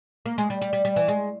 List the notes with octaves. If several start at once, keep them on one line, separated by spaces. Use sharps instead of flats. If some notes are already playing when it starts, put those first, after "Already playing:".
A#3
G#3
G3
G3
G3
G3
E3
G#3